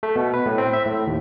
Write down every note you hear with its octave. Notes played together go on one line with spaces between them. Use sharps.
A3
B2
B4
A2
C4
E5
A2
D#2